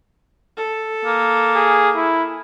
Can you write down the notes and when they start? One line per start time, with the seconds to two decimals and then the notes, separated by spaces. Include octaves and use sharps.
0.57 A4
1.05 A#3
1.55 G#4
1.95 E4